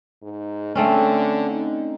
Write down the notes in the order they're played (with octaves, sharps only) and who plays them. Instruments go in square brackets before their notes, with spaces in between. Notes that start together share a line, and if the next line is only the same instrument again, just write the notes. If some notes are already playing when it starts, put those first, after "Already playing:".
[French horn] G#2
[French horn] D3 [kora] A3 C4 C#4
[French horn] D#4